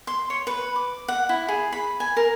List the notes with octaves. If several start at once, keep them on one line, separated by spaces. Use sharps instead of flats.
C6
C#5
B4
D6
F#5
E4
G#4
B5
G#5
A#4